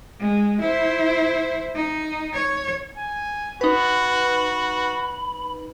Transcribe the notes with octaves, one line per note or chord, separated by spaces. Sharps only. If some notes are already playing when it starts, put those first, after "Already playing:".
G#3
E4 C5
D#4
C#5
G#5
D#4 F#4 B4 B5